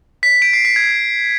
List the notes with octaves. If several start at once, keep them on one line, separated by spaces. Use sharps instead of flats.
B6
D7
C7
B6
G#6